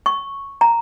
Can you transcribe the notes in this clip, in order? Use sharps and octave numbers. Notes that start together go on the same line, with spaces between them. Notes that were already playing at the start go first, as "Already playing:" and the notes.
C#6
A#5